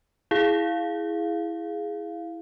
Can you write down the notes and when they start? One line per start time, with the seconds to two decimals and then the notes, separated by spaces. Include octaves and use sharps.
0.31 E4 G#4 F5